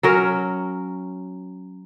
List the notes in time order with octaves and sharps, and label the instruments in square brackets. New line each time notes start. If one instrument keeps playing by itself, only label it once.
[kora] F#3 C#4 A#4